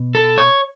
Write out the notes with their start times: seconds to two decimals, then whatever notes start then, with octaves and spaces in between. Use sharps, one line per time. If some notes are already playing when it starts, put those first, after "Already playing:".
Already playing: B2
0.15 A4
0.38 C#5